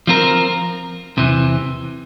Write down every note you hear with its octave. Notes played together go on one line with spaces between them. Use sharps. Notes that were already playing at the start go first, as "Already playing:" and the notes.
F3 C4 F4 A#4
E2 C3 E3